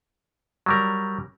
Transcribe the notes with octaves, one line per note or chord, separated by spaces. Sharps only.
F#3 G3 A#4